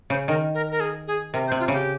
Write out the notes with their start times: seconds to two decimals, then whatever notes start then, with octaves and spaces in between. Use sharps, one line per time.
0.10 C#3 C5
0.28 D#3 A#4
0.54 A#4
0.71 A#4
0.80 G#4
1.07 G#4
1.33 C3 A#4
1.47 C5
1.52 C3
1.60 F4
1.68 C#3 G4